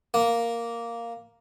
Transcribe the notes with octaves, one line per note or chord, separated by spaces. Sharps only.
A#3